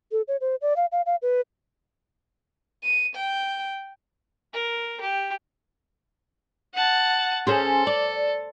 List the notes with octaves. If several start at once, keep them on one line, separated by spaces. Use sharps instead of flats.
A4
C#5
C5
D5
F5
F5
F5
B4
D#7
G5
A#4
G4
F#5 A5
C#4 G#4 A4 C5
D5